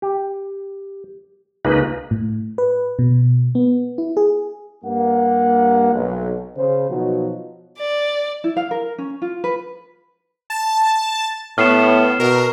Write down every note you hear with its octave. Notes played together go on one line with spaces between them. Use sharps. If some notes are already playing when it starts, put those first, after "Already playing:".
G4
C#2 C#3 A#3 D#4 B4
A2
B4
B2
B3
E4
G#4
G2 A#3 F#5
B1
C#3 C5
B2 F3 F#3 D#4 F#4
D5
E4
F5
A#4
C#4
F4
B4
A5
A2 B3 F6 C7 E7
B2 A#4